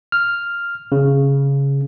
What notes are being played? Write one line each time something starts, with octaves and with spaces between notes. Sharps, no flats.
F6
C#3